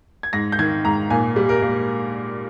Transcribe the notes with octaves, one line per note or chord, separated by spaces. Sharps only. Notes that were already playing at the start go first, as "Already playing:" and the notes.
G#6
G#2 A#6
G6
D#3 G#6
G#2 A#5
A#2 G#5
G3
A#4
A#2